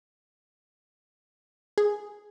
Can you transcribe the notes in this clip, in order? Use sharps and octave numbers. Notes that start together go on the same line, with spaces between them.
G#4